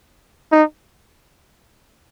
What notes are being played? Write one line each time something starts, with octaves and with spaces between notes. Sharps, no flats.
D#4